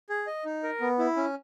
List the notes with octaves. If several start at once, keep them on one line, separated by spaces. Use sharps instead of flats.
G#4
D#5
D#4
A#4
B3
E4
C#4